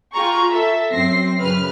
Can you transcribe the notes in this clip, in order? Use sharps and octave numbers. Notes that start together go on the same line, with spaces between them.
F4 G#4 G5 A#5 C#6
A4 E5
F#2 C4 A#6 C7
F#2 C#3 B4 F6